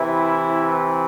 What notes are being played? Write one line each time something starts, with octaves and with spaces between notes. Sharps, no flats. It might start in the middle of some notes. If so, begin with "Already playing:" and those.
Already playing: C3 E3 E4